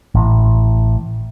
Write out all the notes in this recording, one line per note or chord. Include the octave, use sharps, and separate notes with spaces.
A1